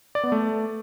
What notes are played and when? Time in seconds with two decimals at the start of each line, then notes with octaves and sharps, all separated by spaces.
0.15 D5
0.24 B3
0.32 A3